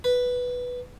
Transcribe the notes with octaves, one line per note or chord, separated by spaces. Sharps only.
B4